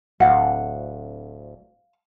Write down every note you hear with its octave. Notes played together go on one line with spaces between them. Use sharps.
D1 F5 F#5